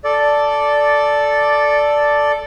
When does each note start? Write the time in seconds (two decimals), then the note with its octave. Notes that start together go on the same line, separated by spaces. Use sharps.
0.04 A4 D5